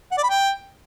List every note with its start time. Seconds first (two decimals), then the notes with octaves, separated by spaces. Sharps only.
0.11 F#5
0.18 D5
0.24 B5
0.30 G5